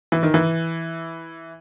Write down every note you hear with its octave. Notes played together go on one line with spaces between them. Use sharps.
E3
D#3
E3